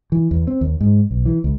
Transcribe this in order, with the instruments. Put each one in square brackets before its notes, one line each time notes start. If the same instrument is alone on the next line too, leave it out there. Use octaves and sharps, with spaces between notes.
[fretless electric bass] E3
E2
C4
D#2
G#2
B1
E3
C#2